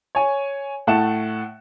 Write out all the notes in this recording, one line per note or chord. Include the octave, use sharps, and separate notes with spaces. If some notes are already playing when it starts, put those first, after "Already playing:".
C#5 G#5
A2 A3 F#5 A5 E7